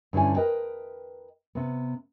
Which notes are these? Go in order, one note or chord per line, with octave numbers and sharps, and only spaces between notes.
G2 D3 C#4 E4 G#5
A#4 B4 D#5 G5
C3 B3